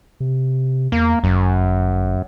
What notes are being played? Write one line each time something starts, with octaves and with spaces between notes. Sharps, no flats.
C3
E2 A#3
G1 F#2